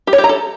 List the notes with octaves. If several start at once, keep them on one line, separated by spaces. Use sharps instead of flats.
G4
C#5
G4
A#5
A4